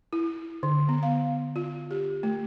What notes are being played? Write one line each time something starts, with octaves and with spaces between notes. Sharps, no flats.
E4
D3
B3
F5
F4
G4
A3